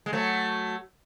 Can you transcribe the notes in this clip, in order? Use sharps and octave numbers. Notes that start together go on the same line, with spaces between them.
G#3
F#3 A3